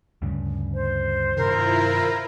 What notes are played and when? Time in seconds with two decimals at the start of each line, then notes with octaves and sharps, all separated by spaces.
0.22 D2 G2 C#3
0.74 C5
1.37 G2 C3 D#3 E4 F4 A#4